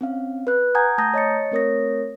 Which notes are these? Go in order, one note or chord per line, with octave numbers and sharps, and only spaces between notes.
C4 C#4 F5
B4 F#6
F#5 G#5 A#5 D#6 G6 G#6
A3 A5 A#5 D#6 G6 A#6
C#5 D#5 A6 C#7
A3 C4 A#4 C#5 D#6 A#6